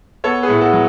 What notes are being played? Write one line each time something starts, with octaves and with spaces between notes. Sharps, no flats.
B3 A4 C#5
G#4 B4
A2
F#4 A4
F#3